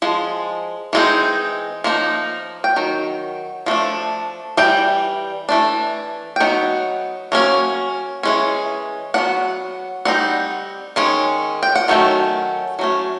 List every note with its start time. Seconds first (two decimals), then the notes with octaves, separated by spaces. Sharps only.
0.02 F3 G#3
0.93 E3 G#3 C4 D#4
1.84 F3 A#3 D#4
2.64 G5
2.76 D#3 F#3
3.66 F3 A3 D4
4.57 E3 G3 G5
5.49 E3 A3 D4
6.36 G5
6.40 F#3 B3 D#4 F#5
7.32 F#3 A#3 C#4
8.23 E3 G#3 C#4
9.14 F#3 B3 D4 F#5
10.05 G3 C4 D#4 F#5
10.96 D#3 G#3 C#4
11.63 G5
11.75 F#5
11.88 D#3 F#3 A3 C#4
12.79 F#3 A3 C#4